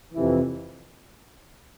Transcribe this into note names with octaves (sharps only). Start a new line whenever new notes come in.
F2 C3 E3